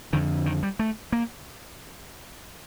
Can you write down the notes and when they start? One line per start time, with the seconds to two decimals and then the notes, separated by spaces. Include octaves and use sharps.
0.13 F2 D3 D#3
0.46 D#3
0.63 G3
0.79 A3
1.12 A#3